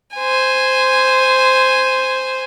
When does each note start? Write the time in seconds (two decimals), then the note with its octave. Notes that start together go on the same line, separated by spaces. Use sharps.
0.16 C5 G#5